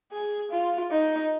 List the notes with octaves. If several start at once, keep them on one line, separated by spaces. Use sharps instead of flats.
G#4
F4
D#4